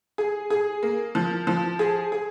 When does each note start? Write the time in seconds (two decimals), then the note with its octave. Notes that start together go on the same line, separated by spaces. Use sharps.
0.18 G#4
0.50 G#4
0.83 A#3
1.15 F3
1.47 F3
1.79 G#4
2.12 G#4